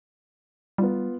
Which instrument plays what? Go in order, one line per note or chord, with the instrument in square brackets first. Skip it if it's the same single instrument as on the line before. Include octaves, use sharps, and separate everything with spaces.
[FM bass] G3 [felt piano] B3 F4